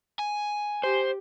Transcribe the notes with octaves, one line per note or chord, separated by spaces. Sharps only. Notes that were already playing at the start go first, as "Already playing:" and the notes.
G#5
G4 C5